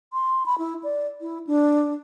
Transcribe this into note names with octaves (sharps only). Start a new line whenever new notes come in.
C6
B5
E4
D5
E4
D4